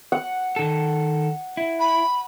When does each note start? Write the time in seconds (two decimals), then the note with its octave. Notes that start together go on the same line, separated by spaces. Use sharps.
0.12 F#5
0.56 D#3 A4
1.57 E4
1.80 B5